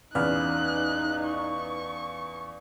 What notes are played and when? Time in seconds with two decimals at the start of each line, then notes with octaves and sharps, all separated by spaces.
0.15 E2 C#4 D#4 B4 D5 F5 F6 F#6
1.25 C#6